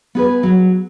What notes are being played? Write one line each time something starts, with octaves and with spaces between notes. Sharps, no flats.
B3 G#4 B4
F#3